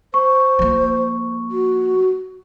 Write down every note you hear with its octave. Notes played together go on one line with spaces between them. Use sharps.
C5 C#6
F3 A#3
F#4